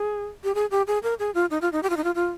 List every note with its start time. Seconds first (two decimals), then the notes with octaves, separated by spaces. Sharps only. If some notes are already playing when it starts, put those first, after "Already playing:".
Already playing: G#4
0.44 G4
0.55 G#4
0.71 G4
0.87 G#4
1.03 A#4
1.19 G#4
1.35 F4
1.51 D#4
1.62 F4
1.72 D#4
1.83 G4
1.90 F4
1.97 D#4
2.04 F4
2.15 F4